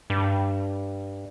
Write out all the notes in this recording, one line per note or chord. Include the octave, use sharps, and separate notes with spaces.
G2